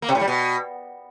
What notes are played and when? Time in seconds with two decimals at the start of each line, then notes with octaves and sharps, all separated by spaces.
0.02 A#3
0.09 C3
0.15 A2
0.21 G3
0.28 B2